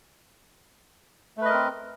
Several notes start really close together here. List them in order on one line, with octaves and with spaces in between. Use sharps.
A3 B4 D#5 A#4 C4